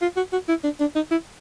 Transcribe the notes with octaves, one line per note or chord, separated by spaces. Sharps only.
F4
F#4
F#4
E4
D4
D4
D#4
E4